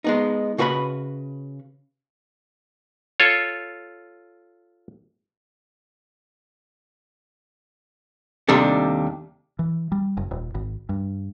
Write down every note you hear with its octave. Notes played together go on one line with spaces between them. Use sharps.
G#3 B3 D#4
C#3 F#4 B4 C5 B5
F4 A4 C#5
D#2 C3 G3 A3 D4
E3
G3
F#1
D#1
G#1
G2